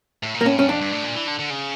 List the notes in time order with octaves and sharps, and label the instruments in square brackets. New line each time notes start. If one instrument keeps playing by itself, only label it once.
[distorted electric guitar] A2
A#2
[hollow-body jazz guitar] A#3
[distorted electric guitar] A2 [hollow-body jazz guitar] C#4
[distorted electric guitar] G2 [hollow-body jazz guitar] C#4
[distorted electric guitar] F2 [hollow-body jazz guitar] D4
[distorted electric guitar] G2
A2
A#2
E3
D3
D3
C#3